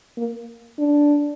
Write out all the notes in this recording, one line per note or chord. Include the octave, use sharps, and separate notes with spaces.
A#3
D4